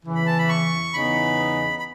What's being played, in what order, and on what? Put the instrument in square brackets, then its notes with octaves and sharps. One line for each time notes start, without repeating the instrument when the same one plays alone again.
[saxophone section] E2 C#3 E3
[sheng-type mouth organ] B5
A5
B5
C#6
[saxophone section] E2 C#3 E3 B3 D#4 [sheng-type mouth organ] B5
[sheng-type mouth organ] B5